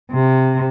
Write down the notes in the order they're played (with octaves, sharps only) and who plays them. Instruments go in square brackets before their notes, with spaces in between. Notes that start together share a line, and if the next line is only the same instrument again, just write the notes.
[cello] C3